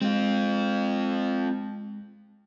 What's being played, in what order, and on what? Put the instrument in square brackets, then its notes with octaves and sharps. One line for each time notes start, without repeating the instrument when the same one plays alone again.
[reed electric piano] G#3 [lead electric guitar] C4 F4